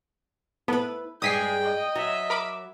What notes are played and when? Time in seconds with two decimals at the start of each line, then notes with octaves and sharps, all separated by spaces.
0.68 B3 E4 A4 B4
1.22 G2 G3 G#3 G5 G#5 D#6 B6 C7
1.62 D#5
1.95 F#3 E5
2.30 A#4 B5 D6